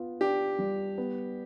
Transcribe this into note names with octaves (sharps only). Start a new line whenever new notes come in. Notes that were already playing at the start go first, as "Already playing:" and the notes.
Already playing: B3 F4
D4 G4
G3
B3